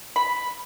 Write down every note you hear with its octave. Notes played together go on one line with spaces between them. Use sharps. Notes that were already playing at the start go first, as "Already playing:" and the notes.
B5